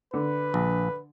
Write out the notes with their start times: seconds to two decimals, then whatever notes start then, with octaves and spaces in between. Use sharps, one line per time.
0.14 D3 B4
0.54 A#1